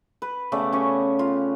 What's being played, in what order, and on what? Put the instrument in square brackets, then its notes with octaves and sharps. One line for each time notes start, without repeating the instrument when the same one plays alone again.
[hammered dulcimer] B4
C#3 A3 B3 D5
C#4 G4 C#5 C#6
F4